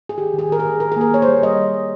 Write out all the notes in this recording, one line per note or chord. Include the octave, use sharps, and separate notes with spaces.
G#4
D#3 G4
D#3 G#4
D#3 A#4
G#4
D#3
D#3 A#4
G#4
A#3 A#4
A#3 C#5
C5
G3
G3 D#5